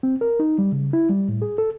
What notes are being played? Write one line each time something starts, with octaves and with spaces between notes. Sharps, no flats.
C4
A#4
D#4
G3
C#3
E4
G3
A2
G#4
A4